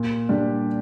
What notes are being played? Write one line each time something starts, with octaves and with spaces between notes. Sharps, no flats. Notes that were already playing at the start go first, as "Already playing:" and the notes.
Already playing: A#2
G3 D4 G4